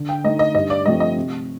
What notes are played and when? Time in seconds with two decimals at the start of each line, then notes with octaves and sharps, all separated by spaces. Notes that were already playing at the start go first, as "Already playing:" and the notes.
Already playing: D3
0.09 G5
0.24 A3 D#4 D#5
0.39 D#5
0.55 G2 D#5
0.70 D5
0.86 F3 A3 C4 D#5
1.00 D#5
1.16 C3